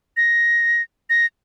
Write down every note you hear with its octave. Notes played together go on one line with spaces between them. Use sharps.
A#6
A#6